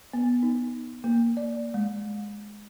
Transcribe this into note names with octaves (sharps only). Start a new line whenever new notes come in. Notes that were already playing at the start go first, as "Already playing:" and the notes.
B3
D#4
A#3
D5
G#3